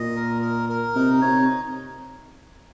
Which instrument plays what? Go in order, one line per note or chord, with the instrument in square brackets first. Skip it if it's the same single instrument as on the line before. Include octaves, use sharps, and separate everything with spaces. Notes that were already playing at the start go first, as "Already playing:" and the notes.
Already playing: [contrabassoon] A#2 [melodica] D#5
[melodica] A#4
A#4
A#4
[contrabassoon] C3 [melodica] D#4
[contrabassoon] C3 [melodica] C#5